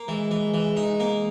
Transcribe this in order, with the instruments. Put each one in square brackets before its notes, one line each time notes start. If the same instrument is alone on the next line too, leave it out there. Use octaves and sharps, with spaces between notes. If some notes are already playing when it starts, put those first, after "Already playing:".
Already playing: [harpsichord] A#3
[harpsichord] E3 [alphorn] G#3
[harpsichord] E3
E3
D#4
A#3